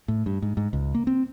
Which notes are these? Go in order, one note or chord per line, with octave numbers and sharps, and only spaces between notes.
A2
G2
G#2
G#2
C#2
A#3
C4